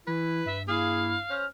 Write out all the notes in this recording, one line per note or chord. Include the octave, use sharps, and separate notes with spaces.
E3 E4 B4
G2 E5
A#3 E4 G#4 F5
C#4 C5 F6